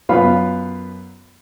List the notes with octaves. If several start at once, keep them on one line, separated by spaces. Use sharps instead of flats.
F#2 B3 F4 F5 B5